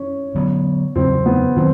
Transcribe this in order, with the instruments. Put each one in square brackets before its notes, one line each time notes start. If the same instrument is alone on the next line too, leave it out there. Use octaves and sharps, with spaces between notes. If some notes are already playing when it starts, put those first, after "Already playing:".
Already playing: [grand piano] C#4
[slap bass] D3 F#3 B3
[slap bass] E2 C#3 F#3 [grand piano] C4
[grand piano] B3
[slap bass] D#3 F#3 [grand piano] C4